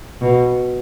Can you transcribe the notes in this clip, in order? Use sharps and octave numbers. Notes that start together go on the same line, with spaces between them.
B2